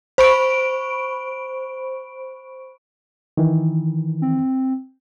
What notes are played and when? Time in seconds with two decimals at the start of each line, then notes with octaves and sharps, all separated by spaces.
0.18 C5 B5 C#6 D7
3.37 D#3 E3
4.22 C4